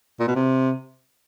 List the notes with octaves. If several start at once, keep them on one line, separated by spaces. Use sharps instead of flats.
A#2
B2
C3